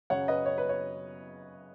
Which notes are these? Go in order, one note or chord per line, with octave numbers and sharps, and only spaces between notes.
F#2 C#3 F#3 C#5 F#5
B4 D#5
C#5
B4
C#5